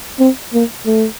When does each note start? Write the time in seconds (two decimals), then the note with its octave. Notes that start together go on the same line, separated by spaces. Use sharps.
0.19 C4
0.53 A#3
0.86 A3